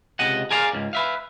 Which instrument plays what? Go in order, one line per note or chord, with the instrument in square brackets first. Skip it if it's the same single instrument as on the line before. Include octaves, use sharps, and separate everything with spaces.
[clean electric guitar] C#2 C3 D#5 F#5
G#4 A#4 D5 F5
C#2 G#2
B4 E5 F5